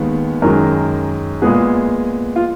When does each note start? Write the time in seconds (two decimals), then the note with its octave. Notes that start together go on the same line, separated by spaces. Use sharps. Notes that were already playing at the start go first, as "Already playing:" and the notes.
Already playing: D#2 D#3 G#3 B3
0.42 F#2 D#3 G#3 A#4
1.42 A#2 G#3 B3 G#4
2.36 F4